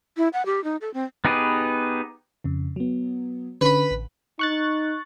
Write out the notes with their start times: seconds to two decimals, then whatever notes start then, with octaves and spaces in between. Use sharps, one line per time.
0.17 E4
0.33 F#5
0.46 G4
0.64 D#4
0.81 A4
0.94 C4
1.25 B3 D#4 G4 G#4 B4
2.44 F2 C#3
2.76 F#3 B3
3.61 D3 C#4 B4 B5
3.91 A1
4.39 D#4 C#6 F#6 A6